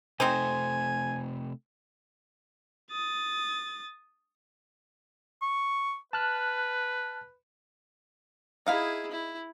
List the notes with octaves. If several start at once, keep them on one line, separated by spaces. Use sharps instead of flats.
C3 A3 C4 D#4 C5 G#5
D#6 A6
C#6
B4 A5 F6 F#6
D#4 E4 G#4 F5 B5
E4